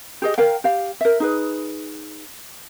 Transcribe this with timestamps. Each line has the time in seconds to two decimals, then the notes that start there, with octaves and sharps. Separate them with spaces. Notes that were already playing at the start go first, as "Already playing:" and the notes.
0.22 G4 G#4 D#5
0.38 A#4 F5 G5
0.64 G4 F5
1.01 A#4 E5
1.20 D#4 G#4 B4